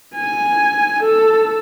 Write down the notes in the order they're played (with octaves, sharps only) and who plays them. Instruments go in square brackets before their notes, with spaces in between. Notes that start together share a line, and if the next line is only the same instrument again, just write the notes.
[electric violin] G#5
A4